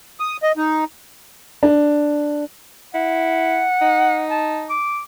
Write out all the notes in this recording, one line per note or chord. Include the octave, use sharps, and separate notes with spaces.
D#6
D#5
D#4
D4
E4 F#5
D#4
A5
D6